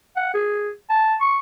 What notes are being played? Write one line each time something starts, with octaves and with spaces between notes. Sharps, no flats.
F#5
G#4
A5
C#6